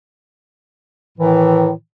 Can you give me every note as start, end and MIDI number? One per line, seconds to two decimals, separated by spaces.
1.19 1.72 45
1.19 1.72 51
1.19 1.72 52